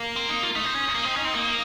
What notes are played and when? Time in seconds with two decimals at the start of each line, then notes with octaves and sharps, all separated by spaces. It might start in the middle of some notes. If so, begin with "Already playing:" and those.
Already playing: A#3
0.16 C4
0.29 D#4
0.43 F4
0.56 A3 D#4
0.65 C4
0.75 C#4
0.95 A#3
1.05 C4
1.15 C#4
1.25 C4
1.35 A#3